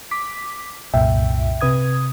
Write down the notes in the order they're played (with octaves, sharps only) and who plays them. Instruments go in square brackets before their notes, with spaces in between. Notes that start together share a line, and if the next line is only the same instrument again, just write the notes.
[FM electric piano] D6 B6
C2 F#2 A#2 E5 G5
C3 B4 D#6 G#6